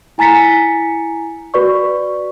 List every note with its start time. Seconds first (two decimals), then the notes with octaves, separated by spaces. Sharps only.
0.18 E4 G#5 A#5 A6 B6 C#7
1.54 F#4 B4 D5 C#6